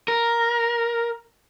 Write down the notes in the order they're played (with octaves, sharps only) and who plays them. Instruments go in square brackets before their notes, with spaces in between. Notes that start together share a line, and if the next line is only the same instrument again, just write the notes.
[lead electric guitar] A#4